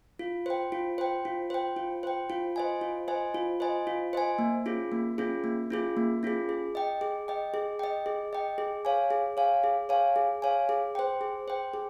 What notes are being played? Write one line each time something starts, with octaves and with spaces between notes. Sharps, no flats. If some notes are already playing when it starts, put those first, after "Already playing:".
F4
C5 G5
F4
C5 G5
F4
C5 G5
F4
C5 G5
F4
C5 D#5 G#5
F4
C5 D#5 G#5
F4
C5 D#5 G#5
F4
C5 D#5 G#5
A#3
C#4 F4 G#4
A#3
C#4 F4 G#4
A#3
C#4 F4 G#4
A#3
C#4 F4 G#4
G#4
D#5 G5
G#4
D#5 G5
G#4
D#5 G5
G#4
D#5 G5
G#4
C#5 F5 G#5
G#4
C#5 F5 G#5
G#4
C#5 F5 G#5
G#4
C#5 F5 G#5
G#4
C5 G5
G#4
C5 G5
G#4